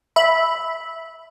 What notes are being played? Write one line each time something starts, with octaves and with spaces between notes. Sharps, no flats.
E5 B5